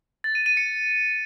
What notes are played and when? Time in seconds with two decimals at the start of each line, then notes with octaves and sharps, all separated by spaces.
0.24 A6
0.35 D#7
0.46 D#7
0.57 C#7